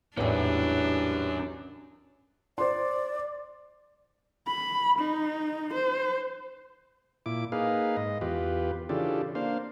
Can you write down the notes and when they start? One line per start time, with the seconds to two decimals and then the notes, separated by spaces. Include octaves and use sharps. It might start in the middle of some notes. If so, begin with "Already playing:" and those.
0.17 A1 E2 G#2 E3 F#3 G3 C#4 D4
2.58 C5 D5 C6
4.47 B5
4.99 D#4
5.74 C5
7.26 A#2 E4 D6
7.52 A#3 D#4 G#4 B4 F5
7.97 G#2 D#5
8.21 E2 F4 G4 B4
8.89 C#3 E3 D4 F4 G4 A4
9.35 A#3 D4 C5 F5